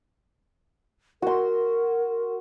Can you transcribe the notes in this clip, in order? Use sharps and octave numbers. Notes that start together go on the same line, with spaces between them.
F#4 A#4 C6